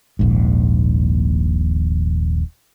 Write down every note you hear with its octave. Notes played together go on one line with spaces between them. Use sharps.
D#1 A#1 G#2